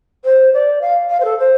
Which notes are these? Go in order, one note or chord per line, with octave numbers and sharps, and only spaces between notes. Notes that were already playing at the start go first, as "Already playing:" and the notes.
C5
D5
F5
F5
C5
A4
C5